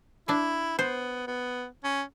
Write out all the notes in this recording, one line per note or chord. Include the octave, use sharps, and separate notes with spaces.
D4 E4 E5
B3 C5
B3
C#4